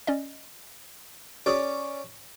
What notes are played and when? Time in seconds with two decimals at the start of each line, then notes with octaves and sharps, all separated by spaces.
0.07 C#4 D5 D#5
1.46 C#4 F#4 G#4 D5